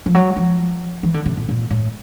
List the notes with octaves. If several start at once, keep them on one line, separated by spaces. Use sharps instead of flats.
F3
F#3
F3
E3
D3
C3
A#2
A#2
A2